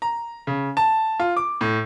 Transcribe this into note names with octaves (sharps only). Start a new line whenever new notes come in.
A#5
C#3
A5
F4
D6
A2